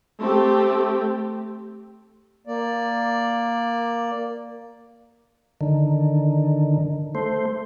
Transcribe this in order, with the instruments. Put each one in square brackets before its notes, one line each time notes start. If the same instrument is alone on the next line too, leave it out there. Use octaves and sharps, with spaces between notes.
[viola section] A3 C4 G4
[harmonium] A#3 D5
[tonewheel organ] D3 D#3
A3 C5